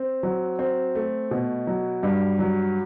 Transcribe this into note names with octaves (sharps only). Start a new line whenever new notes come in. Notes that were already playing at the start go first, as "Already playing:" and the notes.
Already playing: C4
F#3
C4
A3
B2
F#3
G2
F#3